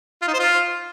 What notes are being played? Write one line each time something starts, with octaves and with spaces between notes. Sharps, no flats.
F4
D#4
C5
F4